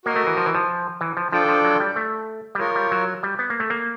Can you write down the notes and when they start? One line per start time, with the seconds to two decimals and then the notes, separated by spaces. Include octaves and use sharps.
0.05 A#3 F#4 A#4 D#5
0.16 A3
0.27 E3
0.37 F3
0.46 E3
0.55 F3
1.01 E3
1.17 F3
1.32 F3 D4 F4 A4 D5 G5
1.49 F3
1.64 F#3
1.80 G3
1.96 A3
2.55 G3
2.60 G#3 F4 A#4 C#5
2.75 G3
2.91 F#3
3.23 G3
3.39 B3
3.50 A#3
3.60 A3
3.70 A#3